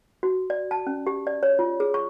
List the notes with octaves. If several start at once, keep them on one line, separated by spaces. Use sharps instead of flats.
F#4
D5
A5
C#4
G4
D5
C#5
F4
G#4
C#6